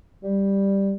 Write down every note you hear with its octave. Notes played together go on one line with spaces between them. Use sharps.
G3